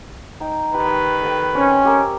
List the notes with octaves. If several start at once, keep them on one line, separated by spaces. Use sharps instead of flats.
D#4 G5
D#3 G4 B4
A4 D#5 G5
C4 C#4
G4 A#4 E6